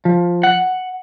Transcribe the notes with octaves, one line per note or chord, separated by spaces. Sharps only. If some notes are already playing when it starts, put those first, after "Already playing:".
F3
F#5